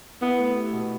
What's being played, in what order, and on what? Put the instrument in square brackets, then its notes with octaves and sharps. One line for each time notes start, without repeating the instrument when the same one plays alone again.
[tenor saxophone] B3 [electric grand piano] E4
[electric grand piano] A3
G4
B2